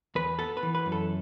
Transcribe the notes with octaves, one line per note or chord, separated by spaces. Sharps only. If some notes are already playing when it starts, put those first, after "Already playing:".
E2 B4
B3 A4
B4
E3
B4
F#2
A4